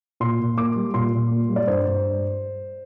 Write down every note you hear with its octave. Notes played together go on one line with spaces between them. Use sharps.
A#2 C6
A#2
A#3 D6
G3
A#2 C6
A#2
A#3
G3
D5
G2 C5
G2